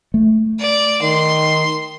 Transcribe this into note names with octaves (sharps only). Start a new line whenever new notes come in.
A3
D5
D#3 C6